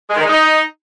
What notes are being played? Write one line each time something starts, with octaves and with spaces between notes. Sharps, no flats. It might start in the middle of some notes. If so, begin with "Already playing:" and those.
G#3
D#3
G#3
D#4